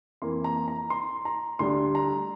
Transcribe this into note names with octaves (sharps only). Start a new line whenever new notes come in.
F2 E3 A#3 C6
A#5
A#5
C6
A#5
D2 D3 G3 D4 C6
A#5